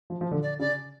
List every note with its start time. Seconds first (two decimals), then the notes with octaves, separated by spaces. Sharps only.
0.10 F3
0.21 F3
0.31 D3
0.43 D5
0.59 C#3 D5